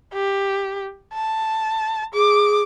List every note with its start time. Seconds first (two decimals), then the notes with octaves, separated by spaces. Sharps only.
0.14 G4
1.14 A5
2.14 G#4 D6